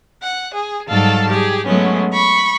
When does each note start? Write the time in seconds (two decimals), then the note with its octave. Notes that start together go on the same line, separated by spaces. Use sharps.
0.23 F#5
0.55 G#4
0.89 G#2 F#3 G3 A4 F5 A5
1.30 G4 G#4
1.67 F#3 G#3 A3 B3 C#4
2.13 B5 C#6